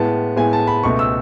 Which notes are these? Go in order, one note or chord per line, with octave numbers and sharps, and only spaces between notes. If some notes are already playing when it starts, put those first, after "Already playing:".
Already playing: A2 G#3 B3 A5
A2 G#3 B3 G#5
A5
B5
C#2 B2 A3 C#6
E6